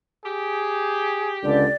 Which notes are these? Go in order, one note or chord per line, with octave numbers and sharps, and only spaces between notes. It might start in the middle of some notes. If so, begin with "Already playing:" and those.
G4 G#4
C#2 D3 D5